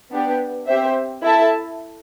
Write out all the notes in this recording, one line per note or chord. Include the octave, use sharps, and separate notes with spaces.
B3 D4 G4
C4 G4 C5 E5
E4 A4 E5 A5